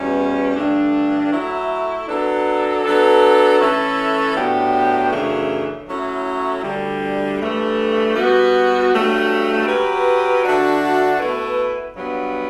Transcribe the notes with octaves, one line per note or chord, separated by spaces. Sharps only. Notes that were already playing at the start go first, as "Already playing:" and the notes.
Already playing: E2 B2 G3 C#4
G2 D3 A3 D4
F#3 A3 E4
F#3 B3 D4 A4
F#3 B3 D4 A4
E3 A3 C#4 E4 A4
A2 F#3 B3 D4 G4
F#2 C#3 E3 A3 D4
F#3 A3 C#4 E4
D2 D3 G3
G2 E3 A3
B2 G3 B3 F#4
G2 F#3 A3
F#3 C#4 G4 B4
D3 A3 D4 F#4
B2 A3 E4 B4
G2 F#3 B3